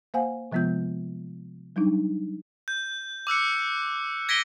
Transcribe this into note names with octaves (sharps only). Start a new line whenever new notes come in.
A#3 C5 F5 F#5 G#5
C3 F3 G#3 B3 F4 G6
F#3 G3 D4 D#4
G6
D6 E6 F#6 C#7
G#6 A#6 B6 D7 D#7 G7